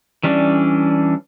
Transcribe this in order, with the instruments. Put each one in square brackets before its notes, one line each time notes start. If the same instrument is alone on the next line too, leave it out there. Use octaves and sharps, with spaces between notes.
[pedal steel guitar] E3 G3 C#4 D4